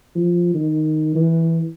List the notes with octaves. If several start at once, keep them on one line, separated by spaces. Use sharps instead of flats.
F3
D#3
E3